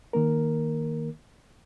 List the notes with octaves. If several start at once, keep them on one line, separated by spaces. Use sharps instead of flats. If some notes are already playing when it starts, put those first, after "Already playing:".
D#3 A#3 A#4